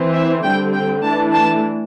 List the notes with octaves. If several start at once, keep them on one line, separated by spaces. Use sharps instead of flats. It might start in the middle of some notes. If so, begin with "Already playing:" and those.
Already playing: E3 C4
E5
D3 G3 C4 G5
G5
E3 A3 D4 A5
A5